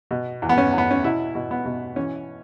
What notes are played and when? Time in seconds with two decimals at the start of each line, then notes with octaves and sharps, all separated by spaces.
0.11 B2
0.42 E2
0.49 B3
0.58 C#4
0.73 E2
0.78 B3
0.91 C#4
1.04 B2 E4
1.35 B2
1.51 B3
1.65 B2
1.96 E3 C#4